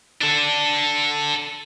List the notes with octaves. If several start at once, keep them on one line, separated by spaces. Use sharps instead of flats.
D4 A4